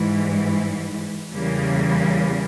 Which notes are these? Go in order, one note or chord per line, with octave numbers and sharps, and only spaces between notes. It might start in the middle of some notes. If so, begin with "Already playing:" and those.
Already playing: G#2 E3 G3
E2 C#3 E3 G3 A#3